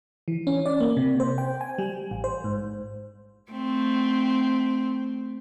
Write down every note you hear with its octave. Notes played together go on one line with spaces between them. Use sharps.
E3
C#4
D5
A#3
C3
C5
G5
G#5
G3
A1
C5
G#2
A3 C4